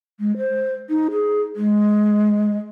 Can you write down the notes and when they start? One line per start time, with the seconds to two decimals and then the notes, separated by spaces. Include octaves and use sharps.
0.20 G#3
0.38 C5
0.89 D#4
1.11 G#4
1.56 G#3